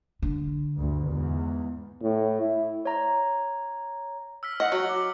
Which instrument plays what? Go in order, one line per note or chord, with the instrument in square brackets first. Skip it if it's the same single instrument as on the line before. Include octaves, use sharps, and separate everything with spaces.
[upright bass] D3
[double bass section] D2 G2
E2 G#2
[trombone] A2
E4
[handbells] C#5 A#5
[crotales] E6 F6 B6
[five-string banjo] D#5 F#5 [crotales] F6 C#7 F#7
[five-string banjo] F#3 [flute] F#4
[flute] D6